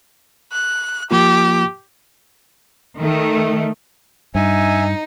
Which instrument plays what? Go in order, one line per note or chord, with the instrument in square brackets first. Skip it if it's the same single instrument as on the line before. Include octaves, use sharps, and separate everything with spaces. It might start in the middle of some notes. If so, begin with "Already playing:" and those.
[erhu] F#6
[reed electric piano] F3 A#3 F4 [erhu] G4
[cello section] D#3 A3
[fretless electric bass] G2 [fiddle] D#4 [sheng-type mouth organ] E5 G#5